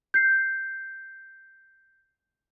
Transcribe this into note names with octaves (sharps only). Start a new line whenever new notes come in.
G6 C7